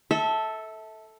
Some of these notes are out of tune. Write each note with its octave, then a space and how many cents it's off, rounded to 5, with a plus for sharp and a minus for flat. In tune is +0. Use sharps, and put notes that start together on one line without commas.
A4 +0 E5 -25